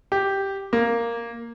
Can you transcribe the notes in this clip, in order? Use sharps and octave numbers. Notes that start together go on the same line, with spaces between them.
G4
A#3